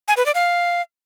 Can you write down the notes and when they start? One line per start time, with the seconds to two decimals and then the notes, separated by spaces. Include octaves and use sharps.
0.08 G#5
0.17 B4
0.26 D5
0.35 F5